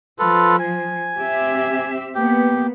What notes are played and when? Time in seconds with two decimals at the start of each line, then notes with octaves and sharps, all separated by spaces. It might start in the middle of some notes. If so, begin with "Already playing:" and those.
0.19 F3 F4 A4 B4
0.59 G#5
1.19 C4 G4 E5
2.15 A#3 B3 G4